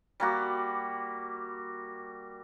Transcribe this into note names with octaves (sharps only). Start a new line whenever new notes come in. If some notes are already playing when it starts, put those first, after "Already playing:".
G3 A#3 F#4